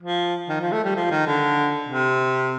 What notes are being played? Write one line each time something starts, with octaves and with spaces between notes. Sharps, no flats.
F3
D#3
F3
A3
G3
F3
D#3
D3
C3